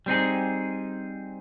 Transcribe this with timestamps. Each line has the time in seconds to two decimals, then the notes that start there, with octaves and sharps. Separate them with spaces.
0.06 G3 C4 D#4 G#4